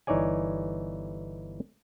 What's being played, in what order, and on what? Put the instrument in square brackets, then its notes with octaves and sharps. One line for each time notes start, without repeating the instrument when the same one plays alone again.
[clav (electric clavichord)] G1 E3 D#4 C#5 D5 G#5